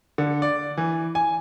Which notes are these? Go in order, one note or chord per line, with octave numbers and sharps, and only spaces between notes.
D3
D5
E3
G#5